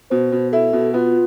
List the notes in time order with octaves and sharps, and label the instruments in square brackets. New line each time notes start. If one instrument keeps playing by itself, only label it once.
[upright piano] B2 [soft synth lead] C5
[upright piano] B2
[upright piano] E4 [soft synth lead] A4
[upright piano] B2
[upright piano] B3 [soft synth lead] F4